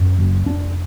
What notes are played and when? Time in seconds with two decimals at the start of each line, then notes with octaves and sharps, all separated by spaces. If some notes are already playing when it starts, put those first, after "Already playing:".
Already playing: F#2
0.18 F#1
0.46 F1 D4